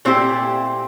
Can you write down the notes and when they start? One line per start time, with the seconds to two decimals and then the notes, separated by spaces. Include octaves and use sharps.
0.05 A#2 A3 C4 E4 G4